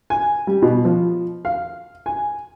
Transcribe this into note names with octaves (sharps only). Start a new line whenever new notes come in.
G#5
G3
B2
F3
F5
G#5